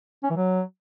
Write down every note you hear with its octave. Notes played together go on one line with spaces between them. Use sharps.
C#4
E3
F#3